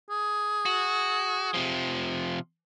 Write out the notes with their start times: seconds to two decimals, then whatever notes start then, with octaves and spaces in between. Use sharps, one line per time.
0.10 G#4
0.66 F#4
1.54 C3 F3